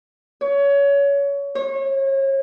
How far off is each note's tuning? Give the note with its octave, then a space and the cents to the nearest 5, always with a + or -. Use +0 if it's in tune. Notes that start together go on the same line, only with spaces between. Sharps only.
C#5 +25
C#5 -35